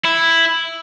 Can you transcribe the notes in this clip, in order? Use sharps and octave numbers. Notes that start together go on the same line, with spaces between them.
E4